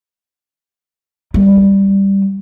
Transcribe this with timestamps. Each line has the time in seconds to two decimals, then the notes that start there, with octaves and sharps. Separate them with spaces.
1.34 G3